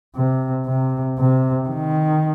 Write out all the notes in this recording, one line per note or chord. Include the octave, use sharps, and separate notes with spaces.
C3
C3
C3
D#3